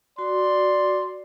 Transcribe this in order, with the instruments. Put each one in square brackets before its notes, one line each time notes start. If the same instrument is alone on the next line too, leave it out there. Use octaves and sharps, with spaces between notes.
[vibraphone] F#4 [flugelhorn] D5 [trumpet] C6